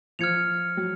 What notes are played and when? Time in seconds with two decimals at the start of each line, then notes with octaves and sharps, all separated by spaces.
0.19 F3 F6 G#6 C#7 F7
0.77 F#3